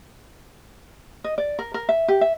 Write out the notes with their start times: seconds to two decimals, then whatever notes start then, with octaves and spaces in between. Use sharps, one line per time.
1.24 D#5
1.38 D5
1.59 A#4
1.74 A#4
1.89 E5
2.08 G4
2.21 E5